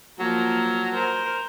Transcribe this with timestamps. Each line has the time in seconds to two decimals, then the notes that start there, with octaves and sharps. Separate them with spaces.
0.19 F3 F#3 A#3
0.94 A#4 C5